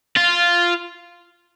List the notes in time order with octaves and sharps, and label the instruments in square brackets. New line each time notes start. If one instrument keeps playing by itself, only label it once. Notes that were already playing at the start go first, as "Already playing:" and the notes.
[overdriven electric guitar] F4